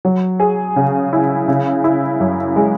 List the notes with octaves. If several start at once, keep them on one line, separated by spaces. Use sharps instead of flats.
F#3
G#4
C#3
E4
C#3
E4
F#2
G#3